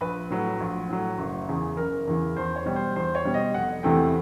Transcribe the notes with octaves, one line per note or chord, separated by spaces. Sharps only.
A#1 B4
A2 F#3
A#1
A2 F#3
F#1
E2 C#3 E3
F#1 A#4
E2 C#3 E3
E2 C5
C#5
B2 G3
C5
E2 C5
C#5
B2 G3
D#5
F1 F#5
E2 C3 E3 A3 G5